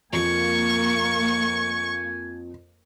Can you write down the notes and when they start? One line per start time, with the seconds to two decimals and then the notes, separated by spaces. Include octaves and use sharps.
0.13 F2 F3 A#3 G#5 C#6